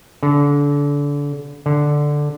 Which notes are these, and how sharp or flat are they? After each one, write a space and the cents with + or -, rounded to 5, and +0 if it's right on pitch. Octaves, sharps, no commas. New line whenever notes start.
D3 -30
D3 +0